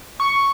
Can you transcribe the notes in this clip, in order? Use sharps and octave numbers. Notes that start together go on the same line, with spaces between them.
C#6